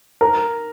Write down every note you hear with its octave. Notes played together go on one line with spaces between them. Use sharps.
A#4